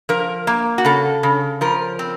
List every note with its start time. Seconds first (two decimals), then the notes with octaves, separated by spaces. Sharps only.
0.09 F3 A#4
0.47 A#3
0.78 F#4
0.85 C#3 A4
1.23 C#3
1.61 F3 A#4
1.99 C4